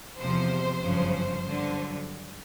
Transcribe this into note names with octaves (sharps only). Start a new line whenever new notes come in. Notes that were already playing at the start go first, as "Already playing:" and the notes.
E2 C3 F3 C5
G1 F#2 C#3 F3
C5
G2 D3 F#3